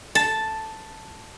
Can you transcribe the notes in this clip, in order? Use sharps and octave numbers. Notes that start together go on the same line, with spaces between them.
A5